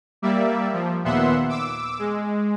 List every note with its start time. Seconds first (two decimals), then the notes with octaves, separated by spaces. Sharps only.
0.22 G3 A#3 D5 E5
0.73 F3
1.04 D#2 A#2 B3 E5 F#5 C6
1.49 D6 E6
1.99 G#3